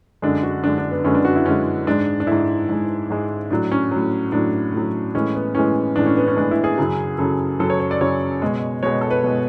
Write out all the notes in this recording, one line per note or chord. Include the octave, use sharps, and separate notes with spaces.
F#2 D3 G#3 D4
F#4
F#2 D3 G#3 D4
D4
B3
F#2 D3 G#3 C#4
D4
F#4
E4
F#2 D3 G#3 C#4
G#2 G#3 D4
D4
G#2 G#3 E4
G#2 G#3
G#2 G#3
A2 F#3 D4
C#4
A2 F#3
A2 F#3 D4
A2 F#3
A2 E3 G#3 C#4
B3
A2 E3 G#3 C#4
A2 E3 G#3 D4
C#4
B3
C#4
A2 E3 G#3 D4
E4
G#4
F#2 C#3 F#3
F#2 C#3 F#3 A4
F#2 C#3 F#3 A4
C#5
C#5
D5
F#2 C#3 F#3 C#5
B2 G#3
B2 G#3 C#5
A4
B4
B2 G#3